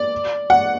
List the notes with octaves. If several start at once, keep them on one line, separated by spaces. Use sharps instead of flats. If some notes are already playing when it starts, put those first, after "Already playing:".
Already playing: D5
F#5